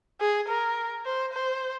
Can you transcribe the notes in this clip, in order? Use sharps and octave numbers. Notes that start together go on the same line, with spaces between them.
G#4
A#4
C5
C5